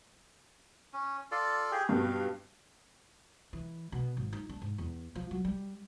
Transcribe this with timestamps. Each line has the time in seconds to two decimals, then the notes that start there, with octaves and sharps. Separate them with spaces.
0.93 C#4
1.31 F4 A4 D5
1.72 G4 G#4
1.89 G2 B2 F5
3.53 E3
3.92 B2
4.17 G#1
4.33 D#4
4.49 D4
4.62 G#2
4.78 E2
5.15 F3
5.31 F#3
5.45 G3